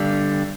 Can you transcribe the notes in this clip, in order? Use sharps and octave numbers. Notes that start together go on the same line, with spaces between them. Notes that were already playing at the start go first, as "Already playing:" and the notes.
Already playing: G2 D3 G3